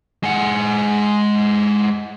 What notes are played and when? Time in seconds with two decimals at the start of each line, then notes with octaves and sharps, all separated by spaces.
0.23 G#3 F#5